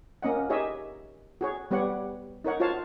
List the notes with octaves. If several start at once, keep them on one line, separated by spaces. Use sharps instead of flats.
A#3 C#4 D#5 F#5
D#4 G4 G#4 C#5 D#5 E5
F#4 G#4 C#5
G3 B3 G4 C#5 F#5
D#4 A#4 C#5 F#5
F4 F#4 C5 C#5 F5 A5